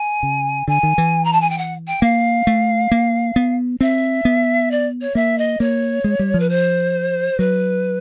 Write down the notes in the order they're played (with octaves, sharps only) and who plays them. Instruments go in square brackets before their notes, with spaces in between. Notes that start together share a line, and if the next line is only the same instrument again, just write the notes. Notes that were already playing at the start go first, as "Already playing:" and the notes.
Already playing: [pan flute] G#5
[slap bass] C#3
[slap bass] D3 [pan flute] G#5
[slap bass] D#3
E3
[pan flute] A#5
A5
G#5
G5
F#5
G5
[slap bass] A#3 [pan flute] F5
[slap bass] A3
A#3
B3
[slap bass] C4 [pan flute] E5
[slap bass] B3
[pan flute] D5
C#5
[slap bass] A#3 [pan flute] E5
[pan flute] D#5
[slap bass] A#3 [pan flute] C#5
[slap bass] G#3
G3
F3
[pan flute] B4
C5
[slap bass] F#3 [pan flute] B4